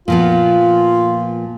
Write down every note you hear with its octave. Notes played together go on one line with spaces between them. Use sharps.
A#2 F3 B3 F4